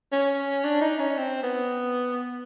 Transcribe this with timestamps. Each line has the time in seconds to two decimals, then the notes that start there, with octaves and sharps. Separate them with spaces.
0.12 C#4
0.64 D4
0.81 D#4
0.99 C#4
1.17 C4
1.43 B3